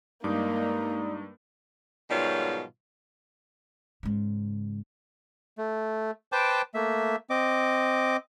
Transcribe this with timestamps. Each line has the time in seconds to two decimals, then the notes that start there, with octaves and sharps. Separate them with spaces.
0.24 G2 G#3 A#3 D#4 D5 D6 D#6
2.09 G#2 B2 D#3 F#3 G3 F4
4.03 G#2 C#3
5.58 A3
6.32 B4 C5 G5 A5 D6
6.74 A3 A#3 E5
7.30 C4 D#5 D6